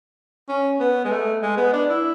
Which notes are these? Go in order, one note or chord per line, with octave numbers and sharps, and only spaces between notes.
C#4
B3
G#3
A3
G#3
B3
D4
E4